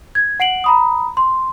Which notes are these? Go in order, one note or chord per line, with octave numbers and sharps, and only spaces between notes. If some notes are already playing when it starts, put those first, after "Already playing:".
G#6
F#5 C7 D7 F#7
A#5 B5 D#6
C6